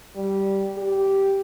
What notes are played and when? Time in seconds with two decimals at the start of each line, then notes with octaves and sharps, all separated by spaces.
0.16 G3
0.78 G4